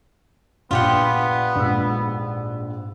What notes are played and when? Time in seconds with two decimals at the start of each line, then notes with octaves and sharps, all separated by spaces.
0.71 A#1 B3 F4 G4 F#5
1.56 A#1 G#2 E6